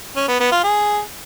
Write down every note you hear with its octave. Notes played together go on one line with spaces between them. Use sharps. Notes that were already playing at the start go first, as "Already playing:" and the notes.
C#4
B3
B3
F4
G#4